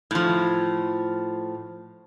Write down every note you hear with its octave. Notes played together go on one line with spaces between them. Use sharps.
A2 F3